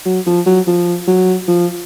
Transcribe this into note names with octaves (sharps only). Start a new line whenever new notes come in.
F#3
F3
F#3
F3
F#3
F3